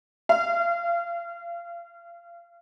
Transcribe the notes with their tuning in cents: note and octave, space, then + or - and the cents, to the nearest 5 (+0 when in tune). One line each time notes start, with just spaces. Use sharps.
F5 -35